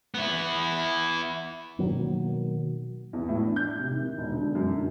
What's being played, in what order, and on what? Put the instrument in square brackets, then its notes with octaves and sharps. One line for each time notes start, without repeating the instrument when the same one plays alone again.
[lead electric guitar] B3 E4
[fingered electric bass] B2 D#3 F#3 A#3
[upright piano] E2
A2
D4
G6
C3
D#3
E1
D3
F#2
D3